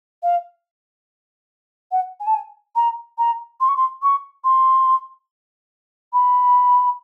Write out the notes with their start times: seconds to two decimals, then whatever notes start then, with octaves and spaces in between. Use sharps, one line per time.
0.23 F5
1.91 F#5
2.20 G#5
2.27 A5
2.34 G#5
2.76 A#5
3.18 A#5
3.60 C6
3.68 C#6
3.77 C6
4.03 C#6
4.44 C6
6.13 B5